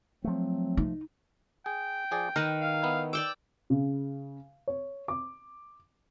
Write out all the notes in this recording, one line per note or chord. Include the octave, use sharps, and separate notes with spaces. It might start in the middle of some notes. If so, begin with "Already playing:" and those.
F3 F#3 A3 C4
D#4
G#4 G5
F3 G#4 D5
D#3 A#4 B4 A#5
F5
B3 D#4 E4
D5 G5 D6 E6
C#3
C#5
D6